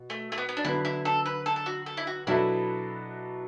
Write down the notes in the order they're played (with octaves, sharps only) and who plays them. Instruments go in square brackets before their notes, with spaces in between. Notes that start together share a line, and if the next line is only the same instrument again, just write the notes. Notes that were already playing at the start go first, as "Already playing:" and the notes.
Already playing: [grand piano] B2
[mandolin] A3
A3
B3
B3
D4
[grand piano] D3 F#3 B3 [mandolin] E4
[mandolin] E4
A4
B4
A4
A4
F#4
A4
E4
F#4
[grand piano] B2 F#3 D4 A4 E5 [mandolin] E4